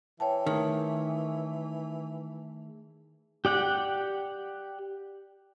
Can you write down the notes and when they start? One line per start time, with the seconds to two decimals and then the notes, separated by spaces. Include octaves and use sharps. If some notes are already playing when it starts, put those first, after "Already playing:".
0.20 E3 C#5 G5 A5
0.47 D#3 A3 G#4
3.45 G4 D5 F#5 G5